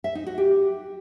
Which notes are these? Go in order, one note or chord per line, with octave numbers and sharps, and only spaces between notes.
E5
D#4
F#4
G4